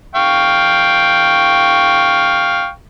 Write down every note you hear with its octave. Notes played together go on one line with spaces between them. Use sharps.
F5 G5 C#6